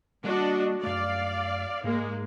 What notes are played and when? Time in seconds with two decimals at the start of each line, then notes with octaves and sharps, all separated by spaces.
0.24 G3 A#3 D4 F#4 D#5
0.83 F#2 A3 D5 F5
1.84 G#2 G#3 A#3